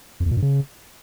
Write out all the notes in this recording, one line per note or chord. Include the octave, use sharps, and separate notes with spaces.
F2
E2
A#2
G2
C#3